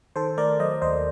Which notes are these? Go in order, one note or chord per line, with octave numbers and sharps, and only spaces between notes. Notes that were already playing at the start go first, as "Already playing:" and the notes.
D#3 A4 C5
A3 A#4 D5
F#3 C5 D#5
D#2 C5 D#5